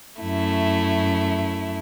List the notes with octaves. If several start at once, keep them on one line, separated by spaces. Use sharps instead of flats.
F#2 A3 E4